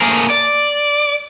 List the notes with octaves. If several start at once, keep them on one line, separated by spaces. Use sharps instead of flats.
A3 A#3 G#4 A#4
D5